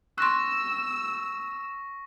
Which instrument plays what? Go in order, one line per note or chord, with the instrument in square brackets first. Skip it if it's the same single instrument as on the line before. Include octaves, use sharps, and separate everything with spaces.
[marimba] C6 F#6 [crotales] C#6 A#6 [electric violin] E6